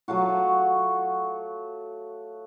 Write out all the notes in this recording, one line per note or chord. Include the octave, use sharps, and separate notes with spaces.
F#3 A3 F4 F#4